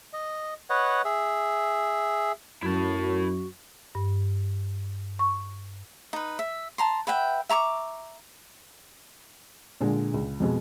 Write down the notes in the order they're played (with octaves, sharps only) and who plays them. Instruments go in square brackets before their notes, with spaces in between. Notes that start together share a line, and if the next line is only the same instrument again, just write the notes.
[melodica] D#5
B4 C#5 D#5 F#5
G#4 E5
[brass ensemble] F#2 [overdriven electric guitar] E4 A5 [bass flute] F#4
[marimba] G2
C#6
[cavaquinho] D#4 B4
E5
A5 A#5 C6
B4 E5 F#5 G5
E5 A#5 C#6 D6
[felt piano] A#2 D3 G#3
C#2
F2 B2 G#3